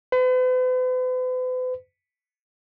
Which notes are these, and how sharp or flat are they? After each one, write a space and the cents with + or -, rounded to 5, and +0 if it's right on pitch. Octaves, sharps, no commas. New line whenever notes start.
B4 +45